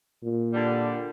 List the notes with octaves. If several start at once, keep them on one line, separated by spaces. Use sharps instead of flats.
A#2
D3 G3